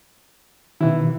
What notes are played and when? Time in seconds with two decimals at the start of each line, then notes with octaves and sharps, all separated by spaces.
0.81 B2 D#3 E3 E4